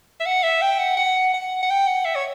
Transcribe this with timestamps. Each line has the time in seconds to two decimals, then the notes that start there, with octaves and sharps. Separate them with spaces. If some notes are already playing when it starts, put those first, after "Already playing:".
0.20 E5
0.26 F#5
0.43 E5
0.62 G5
0.79 F#5
0.97 F#5
1.34 F#5
1.62 F#5
1.70 G5
1.87 F#5
2.05 E5
2.16 C#5